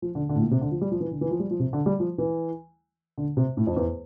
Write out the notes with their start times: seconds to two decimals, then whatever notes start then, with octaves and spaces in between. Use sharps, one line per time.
0.02 F3
0.15 D3
0.29 D3
0.35 A2
0.42 A#2
0.51 C3
0.61 D3
0.72 F3
0.81 G3
0.92 F3
1.00 E3
1.11 D3
1.21 E3
1.31 F3
1.40 G3
1.51 F3
1.59 C3
1.73 D3
1.86 G3
2.00 F3
2.18 E3
3.18 D3
3.37 C3
3.57 A2
3.67 F2
3.76 E2